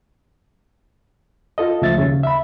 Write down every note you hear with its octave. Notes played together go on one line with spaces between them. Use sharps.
F4 A4 D#5
C#2 F3 A3 E5 A6
D#2 C#3
E5 B5